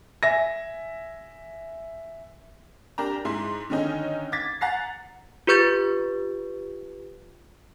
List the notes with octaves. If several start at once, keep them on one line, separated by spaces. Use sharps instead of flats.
E5 G#5 A#6
D4 G4 A#4 A#5
G#2 E4 C6
D3 D#3 C#4 D#4
D6 G#6 A6 B6
F#5 A#5 A6 C7
F4 G4 B4 C#6 G6 A6